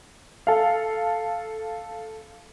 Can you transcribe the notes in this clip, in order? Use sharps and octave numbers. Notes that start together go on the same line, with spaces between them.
A4 F5